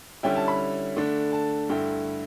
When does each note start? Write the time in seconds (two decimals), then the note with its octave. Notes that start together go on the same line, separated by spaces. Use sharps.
0.23 D3 G3 C#4 E4 G5
0.36 A5
0.48 B5
0.97 D3 A3 D4
1.32 A5
1.69 G2 D3 A3 E4 G5